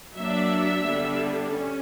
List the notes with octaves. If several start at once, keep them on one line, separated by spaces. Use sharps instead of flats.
F#3 A#3 D4 E5
D3 G3 B3 D4
C#4